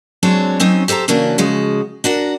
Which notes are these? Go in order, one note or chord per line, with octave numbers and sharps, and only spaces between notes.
F#3 G#3 C4 D4 F#4 C#5
F#3 C4 C#4 D#4
G4 A4 C5 G#5 A#5
C#3 E3 A#3 C#4 D4 F#4
C#3 F3 G#3 F#4
D4 F#4 A#4 F#5